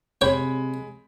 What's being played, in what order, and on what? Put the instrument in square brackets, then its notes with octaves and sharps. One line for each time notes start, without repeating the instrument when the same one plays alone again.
[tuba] C3 [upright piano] G#3 B5 [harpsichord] C#5 G5